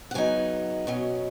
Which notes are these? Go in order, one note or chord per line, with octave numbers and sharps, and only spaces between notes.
F#5
C#3 F#3 B3 D#4 G#5
B2 F#3 C#4